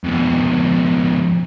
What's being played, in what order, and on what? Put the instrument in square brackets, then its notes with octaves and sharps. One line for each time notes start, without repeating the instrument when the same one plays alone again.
[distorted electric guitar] F2 B2